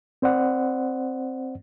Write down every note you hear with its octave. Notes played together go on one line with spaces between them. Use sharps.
C4 C5 D5 F#5